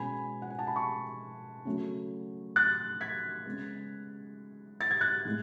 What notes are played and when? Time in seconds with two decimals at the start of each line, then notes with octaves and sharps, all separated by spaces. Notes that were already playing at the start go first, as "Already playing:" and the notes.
Already playing: B2 G#3 C#4 G#5 B5
0.42 F#5
0.50 G#5
0.59 A5
0.67 B5
0.76 A5 C#6
1.65 C#3 F#3 A3
2.56 F#6 A6
3.01 G#6 B6
3.45 C#3 G#3 B3
4.81 A6
4.91 G#6
5.01 F#6 A6
5.25 A2 G#3